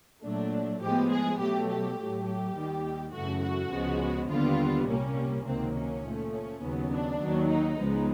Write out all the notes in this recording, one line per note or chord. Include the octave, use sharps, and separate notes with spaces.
A#2 F#3 A3 D4
A2 F3 G#3 B3 G4
G#4
B2 F#3 A3 G4
G4
A2 F#3 A3
G4
D#2 D#3 G3
F#2 C#3 E3 A3 F#4
F#4
C#2 C#3 F3 G#3 B3
D#2 D3 G3 B3 F4
C2 A#2 G3 A#3 C#4
C#2 C3 D#3 F#3 A#3 C4
C#4
A#2 F3 A3
C#4
D#2 C#3 F#3 B3
D4
D#2 D#3 F#3
D#4
C#2 C#3 F3 G#3 B3